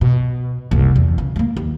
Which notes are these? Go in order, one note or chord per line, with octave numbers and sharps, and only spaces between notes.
B2
F#1 C2
E2
C#3
G#3 A#3
D#2